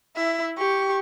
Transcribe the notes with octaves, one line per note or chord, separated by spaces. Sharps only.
E4 E5
G4 C#6